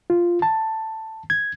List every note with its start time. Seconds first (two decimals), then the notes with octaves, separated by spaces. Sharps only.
0.10 F4
0.42 A5
1.30 G#6